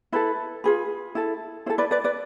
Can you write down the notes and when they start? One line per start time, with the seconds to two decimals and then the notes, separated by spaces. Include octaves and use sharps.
0.13 E4 A4 B4
0.64 F4 G#4 B4
1.15 E4 A4
1.66 E4 C5
1.70 A4
1.78 B4 D5
1.91 B4 D5
2.04 B4 D5